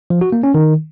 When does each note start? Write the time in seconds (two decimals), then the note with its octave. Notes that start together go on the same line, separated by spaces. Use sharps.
0.10 F3
0.21 F#4
0.32 A#3
0.43 C#4
0.54 D#3